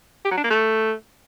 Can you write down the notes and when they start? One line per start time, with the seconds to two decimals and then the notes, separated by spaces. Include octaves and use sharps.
0.25 G4
0.31 F#3
0.38 D4
0.44 A#3
0.50 A3